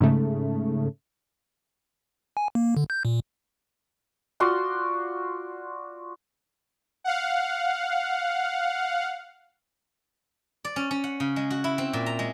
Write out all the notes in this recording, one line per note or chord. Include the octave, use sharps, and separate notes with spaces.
G#2 C#3 A3
G#5
A#3
D3
G6
A#2
F4 F#4 D5 C6
F5 F#5
D5
C#4
C#4
F#5
C#3
G#3
F#4
E4
C4
A#2
A#5
G#3